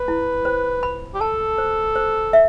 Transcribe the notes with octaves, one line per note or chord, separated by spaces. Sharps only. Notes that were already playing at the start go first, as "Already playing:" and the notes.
Already playing: B4
E4
C5
B5
G4
A4 A5
C5
C5
E5